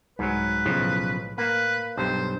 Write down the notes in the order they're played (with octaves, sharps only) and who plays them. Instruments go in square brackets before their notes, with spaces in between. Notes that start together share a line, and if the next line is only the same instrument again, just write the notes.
[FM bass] C2 [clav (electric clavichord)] G#2 F#3 [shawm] B4
[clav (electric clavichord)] B1 C#3 F3 [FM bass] A2
[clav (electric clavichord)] A#3 [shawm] B4
[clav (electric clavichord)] B1 G2 [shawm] C5